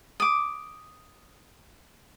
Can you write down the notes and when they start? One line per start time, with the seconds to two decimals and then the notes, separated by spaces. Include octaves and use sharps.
0.20 D6 D#6